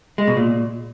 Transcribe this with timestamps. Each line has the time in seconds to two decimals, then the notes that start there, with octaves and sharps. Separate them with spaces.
0.18 G#3
0.27 B2
0.37 A#2